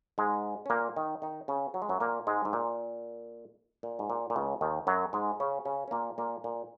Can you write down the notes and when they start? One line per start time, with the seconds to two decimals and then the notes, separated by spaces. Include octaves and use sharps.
0.18 G#2 G#3
0.66 C#4
0.70 A#2 A#3
0.96 D#3 D#4
1.22 D#3 D#4
1.48 C#3 C#4
1.74 F#3
1.82 G#3
1.89 F#2 F#3
2.00 A#2 A#3
2.27 G#2 G#3
2.45 G#2
2.53 A#2
3.83 A#2
3.99 G#2
4.10 A#2
4.30 A#2
4.36 C#2 C#3
4.61 D#2 D#3
4.87 F#2 F#3
5.13 G#2 G#3
5.40 C#3 C#4
5.65 C#3 C#4
5.88 C#4
5.91 A#2 A#3
6.18 A#2 A#3
6.44 A#2